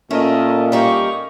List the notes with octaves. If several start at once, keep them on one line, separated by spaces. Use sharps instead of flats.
A#2 A3 C#4 A4 A#4 D#5
G3 A#3 D#4 C#6